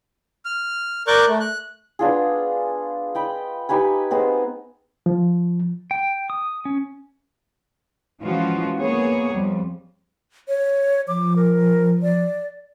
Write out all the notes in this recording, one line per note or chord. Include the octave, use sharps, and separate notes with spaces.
F6
A#4 D5 C#6 D6 F#6 G6
A3
F#6
B3 D4 F4 G#4
D#5 G5 B5
D#4 G4 B4 G#5
G#3 B3 C4
F3
G5
D#6
C#4
E3 F3 G#3 C#4 F4 F#4
A#3 B3 G#4 C#5
F2 G3
C#5
F3 D6
A#4
D5